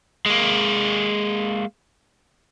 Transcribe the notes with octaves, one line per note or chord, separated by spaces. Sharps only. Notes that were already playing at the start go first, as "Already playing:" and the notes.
G#3 A#3